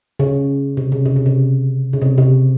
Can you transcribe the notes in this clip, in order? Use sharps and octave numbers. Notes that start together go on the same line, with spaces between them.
C#3
C3
C#3
C3
C#3
C3
C#3
C3
C3